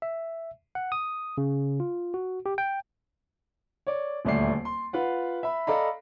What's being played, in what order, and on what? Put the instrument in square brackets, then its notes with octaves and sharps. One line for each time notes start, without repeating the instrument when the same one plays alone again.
[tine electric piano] E5
F#5
D#6
C#3
F4
F#4
G4
G5
[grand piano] C#5 D5
D#1 D2 A3 D5 C7
C6
F4 B4 F#5
E5 B5
A4 D5 D#5 F5 A#5 B5